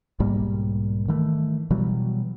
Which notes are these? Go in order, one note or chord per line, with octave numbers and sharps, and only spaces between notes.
B1 G#2 G3 A#3
D#3 E3 A3
B2 E3 F#3 G3